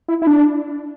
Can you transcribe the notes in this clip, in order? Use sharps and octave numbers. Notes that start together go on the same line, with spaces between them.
E4
E4
D4